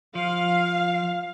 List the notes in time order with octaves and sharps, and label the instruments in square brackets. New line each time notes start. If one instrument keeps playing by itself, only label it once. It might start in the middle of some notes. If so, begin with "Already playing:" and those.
[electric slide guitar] F3 [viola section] F5